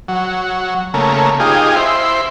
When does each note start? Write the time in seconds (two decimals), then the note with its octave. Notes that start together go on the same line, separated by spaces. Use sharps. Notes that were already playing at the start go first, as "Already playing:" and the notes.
0.08 F#3
0.94 C#3 A3 A#3
1.40 D#4 F4 G4 G#4
1.76 E4 C5